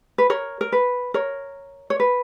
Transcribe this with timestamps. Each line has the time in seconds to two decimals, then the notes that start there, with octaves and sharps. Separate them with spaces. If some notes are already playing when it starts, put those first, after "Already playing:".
0.18 B4
0.30 A#4 C#5
0.61 A#4
0.72 B4
1.14 A#4 C#5
1.90 C#5
2.00 B4